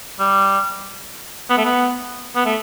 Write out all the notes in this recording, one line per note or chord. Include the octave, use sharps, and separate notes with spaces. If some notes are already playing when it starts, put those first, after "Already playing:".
G3
B3
A3
B3
B3
A3